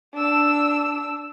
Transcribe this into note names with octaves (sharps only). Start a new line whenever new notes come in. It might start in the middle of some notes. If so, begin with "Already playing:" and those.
D4 E6